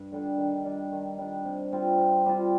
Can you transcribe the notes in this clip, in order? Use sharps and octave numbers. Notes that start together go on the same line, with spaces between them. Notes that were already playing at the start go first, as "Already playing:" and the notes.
Already playing: G2
D3 G3 D4
D#3
G3 D4
D#3
G3 D4
C3
G3 C4 F4
C3
G3 C4 F4